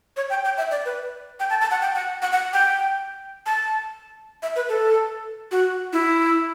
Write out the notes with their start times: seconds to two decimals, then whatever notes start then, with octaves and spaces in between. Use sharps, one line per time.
0.17 C#5
0.30 G5
0.45 G5
0.57 E5
0.71 D5
0.85 B4
1.40 G5
1.50 A5
1.61 A5
1.71 F#5
1.82 G5
1.95 F#5
2.22 F#5
2.32 F#5
2.53 G5
3.46 A5
4.42 E5
4.56 B4
4.69 A4
5.51 F#4
5.93 E4